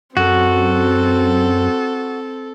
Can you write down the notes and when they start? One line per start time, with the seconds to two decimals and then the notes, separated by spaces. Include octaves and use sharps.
0.17 F#2 C4 F#4 A4